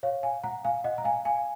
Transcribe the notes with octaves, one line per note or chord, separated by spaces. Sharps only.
C#5 F5
F5 G#5
F#5 A#5
F5 G#5
D#5 F#5
A#5
F5 G#5
F5 G#5